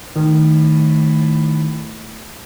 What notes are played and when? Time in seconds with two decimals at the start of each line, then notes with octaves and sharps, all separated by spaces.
0.16 A2 D#3